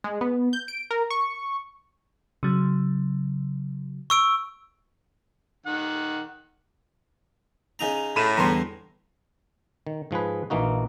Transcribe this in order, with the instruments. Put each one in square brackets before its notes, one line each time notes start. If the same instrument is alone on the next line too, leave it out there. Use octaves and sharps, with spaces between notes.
[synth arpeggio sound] G#3
B3
G6
D7
A#4
C#6
[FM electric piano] C#3 F#3
[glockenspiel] C#6 E6 D7
[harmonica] D#3 F#5
[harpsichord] C#3 D#4 A#5
[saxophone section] A2 [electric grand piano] B5 D#7 E7
[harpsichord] E2 D3 G3 [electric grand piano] A#5 C6
[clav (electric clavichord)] D#3
G#2 F3 G#4 B4
A#1 E3 A#3 D#4 F#4